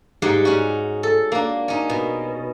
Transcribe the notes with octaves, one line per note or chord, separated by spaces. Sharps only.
G#2 G3 D#4 G4 F#5 C6
C#4 F#4
A4
A#3 D4
C#4 D#4
B2